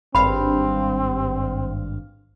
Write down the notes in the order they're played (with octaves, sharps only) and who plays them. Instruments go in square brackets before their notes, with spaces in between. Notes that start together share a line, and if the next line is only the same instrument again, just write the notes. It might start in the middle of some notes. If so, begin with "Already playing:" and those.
[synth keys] G#1 G2 F5 [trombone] C4 [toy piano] B5